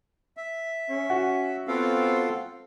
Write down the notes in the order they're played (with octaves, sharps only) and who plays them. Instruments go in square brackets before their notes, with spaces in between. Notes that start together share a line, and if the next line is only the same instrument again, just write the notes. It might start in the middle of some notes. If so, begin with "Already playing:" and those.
[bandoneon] E5
[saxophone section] C#4
[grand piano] F#4
[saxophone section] B3 C4 [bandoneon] F4 A4 F5